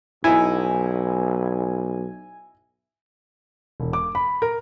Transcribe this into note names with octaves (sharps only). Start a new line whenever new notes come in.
B1 D#4 E4 G#5
E1
D6
B5
A#4